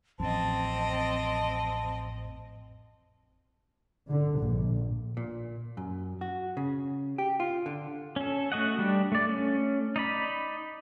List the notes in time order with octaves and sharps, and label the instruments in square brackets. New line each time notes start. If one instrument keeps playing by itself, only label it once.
[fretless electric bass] A1 F2 [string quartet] C4 D#5 [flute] A5
[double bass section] D3
A#1
[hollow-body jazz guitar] A#2
F#2
F#4
C#3
G4
F4
D3
[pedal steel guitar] C#4 A4
A3 F#4 D#5 F#5
G3 D4 G4
A3 D5
A3 C#4
D#4 D5 B5